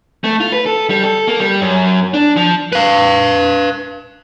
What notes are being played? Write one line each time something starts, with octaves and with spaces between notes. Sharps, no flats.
A3
F4
B4
A4
G3
A4
A#3
G3
F#2
D4
F3
B4 F5